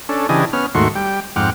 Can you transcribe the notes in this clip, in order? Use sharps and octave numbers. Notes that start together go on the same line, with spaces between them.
C#4 D4 A4
C#3 E3 D4 G4 D#5 G#5
B3 C#4 F6
D#2 G#2 A3 F#4 C6 C#6
G3 G5
F2 G#2 F#5 G5 D6 F6